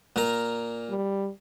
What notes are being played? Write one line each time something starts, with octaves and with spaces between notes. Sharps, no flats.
A#2 A#4
G3